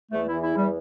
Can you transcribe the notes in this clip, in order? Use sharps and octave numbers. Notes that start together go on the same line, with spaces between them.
E2 A3
E4
E3
E4
E2 G3